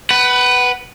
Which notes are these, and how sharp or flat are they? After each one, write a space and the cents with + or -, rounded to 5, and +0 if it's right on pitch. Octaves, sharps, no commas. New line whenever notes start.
B4 +0 F#5 +25